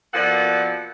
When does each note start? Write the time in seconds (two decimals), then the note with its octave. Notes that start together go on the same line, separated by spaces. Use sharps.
0.14 B2 F3 A#3 A4 D5 F#5